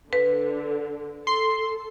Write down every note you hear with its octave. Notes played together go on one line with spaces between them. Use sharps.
D3 B4
A4 C6